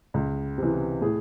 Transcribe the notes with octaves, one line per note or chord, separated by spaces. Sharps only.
C#2
C3 E3
A2 G#4